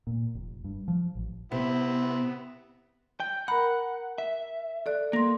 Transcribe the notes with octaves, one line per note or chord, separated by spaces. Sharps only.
A#2
F1
G2
F3
A1
C3 B3 C4 E4
G5
A#4 F#5 A#5 B5
E5
A4 D5 F#6
A#3 C6 A#6